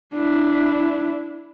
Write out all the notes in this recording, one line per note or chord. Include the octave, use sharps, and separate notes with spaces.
D4 E4